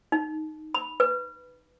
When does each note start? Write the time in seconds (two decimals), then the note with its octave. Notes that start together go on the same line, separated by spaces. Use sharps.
0.12 D#4
0.75 B5
1.00 B4